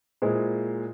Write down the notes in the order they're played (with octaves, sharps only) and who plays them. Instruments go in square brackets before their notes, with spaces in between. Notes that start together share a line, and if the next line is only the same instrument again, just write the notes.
[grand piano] A#2 G#3 E4 G#4 C5